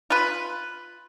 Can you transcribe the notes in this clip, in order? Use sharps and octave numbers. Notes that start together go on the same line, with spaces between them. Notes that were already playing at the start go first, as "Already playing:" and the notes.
F4 B4